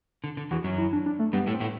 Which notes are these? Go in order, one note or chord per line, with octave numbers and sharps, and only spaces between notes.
D3
D3
E2 E3 F#4
F#2 F#3
E4
D4
D4
A3
G2 G3 B3
A2 A3
C4
A2 A3 B3